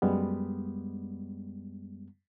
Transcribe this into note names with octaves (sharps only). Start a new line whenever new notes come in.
F#2 G3 G#3 B3